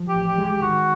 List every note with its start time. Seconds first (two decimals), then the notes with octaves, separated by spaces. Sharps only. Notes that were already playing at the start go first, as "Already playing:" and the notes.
Already playing: F3
0.09 G4
0.14 A1
0.27 G4
0.38 G#3
0.45 G4
0.62 D#3 F#4